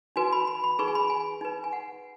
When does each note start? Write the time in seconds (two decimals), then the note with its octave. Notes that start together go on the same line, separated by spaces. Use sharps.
0.16 D#4 F#4 B4 G#5
0.32 B5
0.47 B5
0.64 B5
0.79 D#4 G#4 B4 C#6
0.88 G#5
0.95 B5
1.10 G#5
1.41 D#4 B4
1.64 G#5
1.73 F#5